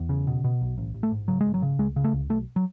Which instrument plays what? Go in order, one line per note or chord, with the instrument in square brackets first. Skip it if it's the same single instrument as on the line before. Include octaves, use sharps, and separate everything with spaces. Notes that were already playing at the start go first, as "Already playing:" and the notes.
Already playing: [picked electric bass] E2
C#3
B2
B2
B1
A1
A1
A3
G#2
C#3 F#3
G#1 G#3
F#3
C#3
C#2 G#3
C#3
A3
C#2
B1 A3
F#3